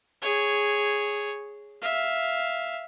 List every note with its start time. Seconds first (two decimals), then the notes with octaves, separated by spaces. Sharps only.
0.22 G#4 C#5
1.82 E5 F5